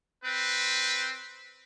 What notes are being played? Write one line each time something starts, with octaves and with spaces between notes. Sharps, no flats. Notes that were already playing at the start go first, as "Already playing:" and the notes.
C4 B4